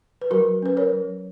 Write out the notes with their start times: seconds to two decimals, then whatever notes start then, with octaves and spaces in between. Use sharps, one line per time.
0.21 B4
0.31 F#3 F#4 A#4
0.62 C#4 B4
0.77 A#4 C#5
0.92 F#3